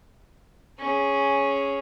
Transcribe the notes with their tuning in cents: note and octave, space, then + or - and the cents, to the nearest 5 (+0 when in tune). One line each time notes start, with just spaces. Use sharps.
C#4 +0 G#4 +0